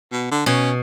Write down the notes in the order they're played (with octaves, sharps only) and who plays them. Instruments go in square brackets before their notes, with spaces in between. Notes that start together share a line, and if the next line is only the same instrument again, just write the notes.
[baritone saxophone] B2
D3
[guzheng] B2 [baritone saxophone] C#4